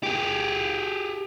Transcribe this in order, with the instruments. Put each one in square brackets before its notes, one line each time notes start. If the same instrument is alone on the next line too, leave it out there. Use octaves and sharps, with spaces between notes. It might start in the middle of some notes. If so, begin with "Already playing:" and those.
[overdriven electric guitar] G4 G#4